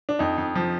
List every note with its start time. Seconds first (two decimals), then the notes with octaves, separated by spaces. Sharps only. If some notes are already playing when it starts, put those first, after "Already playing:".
0.09 D4
0.19 F2 D#4
0.38 F2
0.55 F3